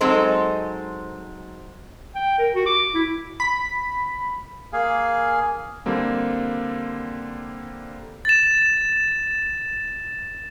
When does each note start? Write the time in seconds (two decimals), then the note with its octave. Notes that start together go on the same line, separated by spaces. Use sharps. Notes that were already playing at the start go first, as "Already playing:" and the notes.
0.01 F#3 G#3 C4 D#4 A4 C5
2.15 G5
2.39 A#4
2.55 F#4
2.66 D6
2.94 E4
3.40 B5
4.73 A#3 G#4 F5 G#5
5.86 D3 G3 A#3 C4
8.25 A6 E7